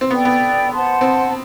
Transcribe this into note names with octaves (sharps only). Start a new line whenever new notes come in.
C4
B3 A4 D5 G5
B3
C5 F#5 A5 C6
C4